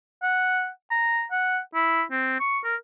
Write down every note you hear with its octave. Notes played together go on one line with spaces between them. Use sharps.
F#5
A#5
F#5
E4
C4
C#6
A#4